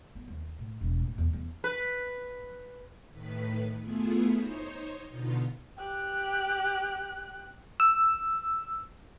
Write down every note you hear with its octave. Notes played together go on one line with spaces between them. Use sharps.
B3
D#2
A2
E1
A2
E2
E2
B4
A2 D#3 B4 B5
A3 B3 E4 F4 G#4
D#4 C5 C#5
B2 D3 B3 D#4 F4
G4 F#6
E6